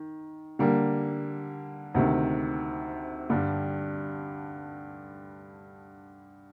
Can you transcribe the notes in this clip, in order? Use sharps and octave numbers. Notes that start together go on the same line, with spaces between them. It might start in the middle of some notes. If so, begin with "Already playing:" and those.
Already playing: D#3
D3 G3 A#3
D2 C3 D#3
G2 D3 G3